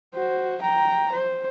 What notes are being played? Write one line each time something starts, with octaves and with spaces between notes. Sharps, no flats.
F#4 C5
G5 A#5
C5